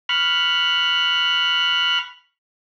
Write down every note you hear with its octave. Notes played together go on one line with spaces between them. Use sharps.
B5 C#6 F6 F#6